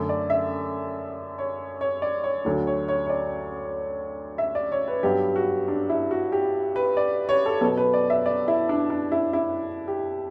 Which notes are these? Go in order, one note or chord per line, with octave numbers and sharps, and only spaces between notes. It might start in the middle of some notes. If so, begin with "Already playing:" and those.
Already playing: F#2 D3 A3
D5
E5
C#5
C#5
D5
C#5
D2 D3 F#3
C#5
C#5
C#5
D5
E5
D5
C#5
B4
G2 F#3 B3 G4
F#4
D4
E4
F#4
G4
B4
D5
C#5
A4
B2 F#3 B3 A4
B4
D5
E5
D5
E4
D4
D4
E4
E4
G4